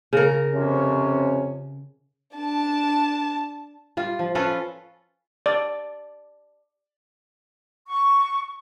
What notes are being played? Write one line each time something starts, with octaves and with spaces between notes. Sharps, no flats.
C#3 A#4
F2 C3 C#4
D4 A5
G3 F4
F3
C#4 F4 A4 B4
D5
C#6